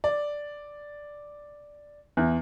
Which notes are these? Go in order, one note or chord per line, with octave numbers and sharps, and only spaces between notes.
D5
E2